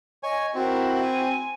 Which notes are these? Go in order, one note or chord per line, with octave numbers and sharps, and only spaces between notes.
C#5 D#5 G#5
C4 E4 F#4 A#4
G#5